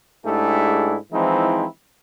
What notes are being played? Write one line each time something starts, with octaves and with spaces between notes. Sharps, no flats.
G#2 A3 D4 E4 G4 G#4
E3 F3 G#3 C4 D#4 E4